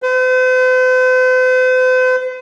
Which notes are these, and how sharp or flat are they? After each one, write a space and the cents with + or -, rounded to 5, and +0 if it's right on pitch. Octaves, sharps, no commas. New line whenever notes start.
C5 -45